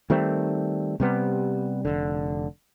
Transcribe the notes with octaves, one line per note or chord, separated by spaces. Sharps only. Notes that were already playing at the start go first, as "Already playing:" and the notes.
D#3 G3 A3 C4
C3 G3 B3
F1 A#1 D3